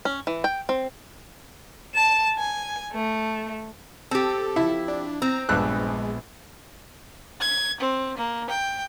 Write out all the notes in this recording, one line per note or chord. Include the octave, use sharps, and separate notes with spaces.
C#4
E3
G5
C4
A5 E7
G#5
A3
C4 G4 A4
F3 E4
D4
C4 A#5
A#1 G2 G#3 B3 E6 F#6
G#6
C4
A#3
G5